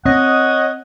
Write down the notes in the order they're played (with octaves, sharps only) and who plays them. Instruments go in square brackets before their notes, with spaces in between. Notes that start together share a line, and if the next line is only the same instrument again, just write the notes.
[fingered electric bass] C4 [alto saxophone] C#5 [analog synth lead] D#5 [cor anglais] F#5